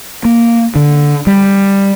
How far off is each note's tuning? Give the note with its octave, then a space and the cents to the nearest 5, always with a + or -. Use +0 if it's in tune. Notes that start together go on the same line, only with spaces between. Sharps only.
A#3 +0
D3 -5
G3 +10